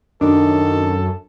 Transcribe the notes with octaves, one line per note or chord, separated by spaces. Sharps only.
F#2 D#3 D4 A4